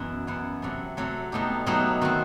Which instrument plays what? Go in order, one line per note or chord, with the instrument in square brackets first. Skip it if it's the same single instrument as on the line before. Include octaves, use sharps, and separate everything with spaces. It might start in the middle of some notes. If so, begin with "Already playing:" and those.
Already playing: [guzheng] F#2 B2 E3 B3 F#4
F#2 E3 B3
C3 F#3 A3
C3 F#3 A3
B2 F#3 A3 D#4 G4
B2 F#3 A3 D#4 G4
D#3 A3 C4 F#4